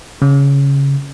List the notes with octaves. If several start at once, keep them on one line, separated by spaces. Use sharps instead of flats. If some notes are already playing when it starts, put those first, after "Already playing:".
C#3